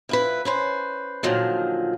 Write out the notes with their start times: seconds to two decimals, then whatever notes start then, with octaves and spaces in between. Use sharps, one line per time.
0.09 F2 E4 B4
0.45 C#4 B4 C5
1.23 A#2 D3 D#3 F3 F#3